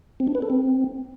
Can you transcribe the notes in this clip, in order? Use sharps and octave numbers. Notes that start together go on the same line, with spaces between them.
C4
D4
B4
A4
C4